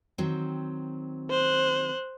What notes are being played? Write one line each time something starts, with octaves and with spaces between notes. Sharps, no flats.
D#3 F#3 C4
C5 F#6